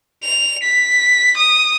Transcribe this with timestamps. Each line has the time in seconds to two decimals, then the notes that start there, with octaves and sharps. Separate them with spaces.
0.24 F7
0.63 B6
1.37 D#6